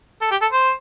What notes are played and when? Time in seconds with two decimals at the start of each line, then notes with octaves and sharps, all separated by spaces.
0.21 A4
0.31 G4
0.42 A4
0.52 C5